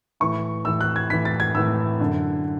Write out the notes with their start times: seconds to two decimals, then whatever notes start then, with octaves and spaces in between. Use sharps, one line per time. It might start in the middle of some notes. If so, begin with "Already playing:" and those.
0.20 A2 E3 C#6
0.65 A2 E6
0.68 E3
0.81 F#6
0.96 G#6
1.10 A2 E3 B6
1.25 A6
1.40 G#6
1.55 A2 E3 E6
2.01 F#2 D3